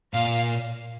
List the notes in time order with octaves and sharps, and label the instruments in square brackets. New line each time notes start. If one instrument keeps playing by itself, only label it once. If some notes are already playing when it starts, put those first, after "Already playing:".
[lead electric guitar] A#2 [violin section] F5